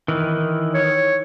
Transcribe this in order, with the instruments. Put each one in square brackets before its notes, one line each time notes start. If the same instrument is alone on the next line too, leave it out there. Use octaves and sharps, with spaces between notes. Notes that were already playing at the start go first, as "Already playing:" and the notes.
[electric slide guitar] D#3 E3
[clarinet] C#5